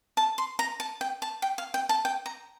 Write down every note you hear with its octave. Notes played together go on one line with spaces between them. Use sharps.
A5
C6
A#5
A5
G5
A5
G5
F5
G5
A5
G5
A#5